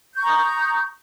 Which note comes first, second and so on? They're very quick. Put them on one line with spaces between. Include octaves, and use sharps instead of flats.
G6 C#6 A#5 D#6